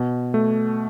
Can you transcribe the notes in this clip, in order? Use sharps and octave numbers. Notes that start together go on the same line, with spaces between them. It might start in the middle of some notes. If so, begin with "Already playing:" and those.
Already playing: B2
A3